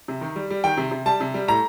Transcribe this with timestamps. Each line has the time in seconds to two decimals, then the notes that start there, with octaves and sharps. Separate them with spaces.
0.08 C3
0.21 D#3
0.36 G3
0.50 G3
0.64 D#3 G5
0.78 C3
0.91 C3
1.06 G3 A5
1.21 C3
1.34 G3
1.48 A2 A#5